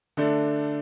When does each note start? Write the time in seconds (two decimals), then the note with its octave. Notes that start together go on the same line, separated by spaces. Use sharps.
0.17 D3 A3 D4